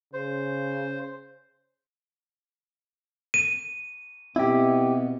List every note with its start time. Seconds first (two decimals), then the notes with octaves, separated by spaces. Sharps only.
0.14 C#3 C5
3.34 D#7
4.36 B2 B3 C4 E4 G4